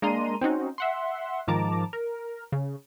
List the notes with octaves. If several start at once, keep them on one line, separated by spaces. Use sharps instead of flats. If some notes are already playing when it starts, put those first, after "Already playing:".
G#3 A#3 D4 A#5 C6 D#7
C4 C#4 D#4 F#4
E5 F#5 C6
G#2 D#3 F3 A5 A#5 D6
A#4
C#3